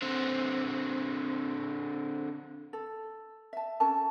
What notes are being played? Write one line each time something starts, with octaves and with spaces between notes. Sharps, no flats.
D3 C4
A4
E5 A5
C#4 A4 A#4 A5